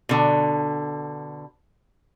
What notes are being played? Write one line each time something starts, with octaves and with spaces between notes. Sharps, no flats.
B2 D3